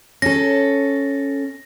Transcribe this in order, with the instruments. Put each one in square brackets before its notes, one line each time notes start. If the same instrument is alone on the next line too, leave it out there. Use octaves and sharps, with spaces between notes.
[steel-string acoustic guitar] C#4 A4 [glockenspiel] A#6